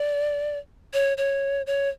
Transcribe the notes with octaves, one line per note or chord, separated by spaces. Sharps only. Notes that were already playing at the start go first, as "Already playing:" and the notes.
Already playing: D5
C#5
C#5
C#5